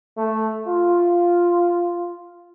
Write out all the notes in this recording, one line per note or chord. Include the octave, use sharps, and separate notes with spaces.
A3
F4